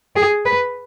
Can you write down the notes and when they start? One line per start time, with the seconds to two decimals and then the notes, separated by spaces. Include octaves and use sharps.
0.16 G#4
0.45 B4